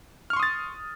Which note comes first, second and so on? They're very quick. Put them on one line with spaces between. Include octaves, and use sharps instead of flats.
F6 C#6 C6 D#6 A6